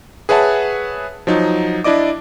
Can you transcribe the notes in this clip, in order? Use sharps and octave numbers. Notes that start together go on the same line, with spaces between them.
G#4 B4 C#5 E5 F#5 A5
F3 F#3 D#4
D4 E4 D5 D#5 D6